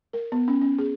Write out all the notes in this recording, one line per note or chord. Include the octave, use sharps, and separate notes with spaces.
A#4
B3
C#4
C#4
G#4